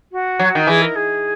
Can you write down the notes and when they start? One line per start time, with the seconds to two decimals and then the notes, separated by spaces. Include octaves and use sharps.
0.11 F#4
0.40 F#3
0.55 D#3
0.67 E3 G#4
0.81 A#4
0.95 G#4